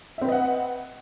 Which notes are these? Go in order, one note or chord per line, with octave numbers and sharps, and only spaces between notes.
C4 B4 D#5 E5 F#5